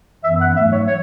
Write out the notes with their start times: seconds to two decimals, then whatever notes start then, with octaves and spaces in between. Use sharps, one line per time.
0.23 F#2 E3 B3 E5
0.40 F#5
0.55 G#2 F#3 A3 E5
0.70 C#5
0.86 E3 C#5